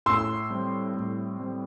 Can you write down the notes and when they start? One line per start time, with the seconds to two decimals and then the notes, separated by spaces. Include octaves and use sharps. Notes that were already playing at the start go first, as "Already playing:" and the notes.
0.06 A2 C6 E6
0.50 G3 C4
0.94 A2
1.39 G3 C4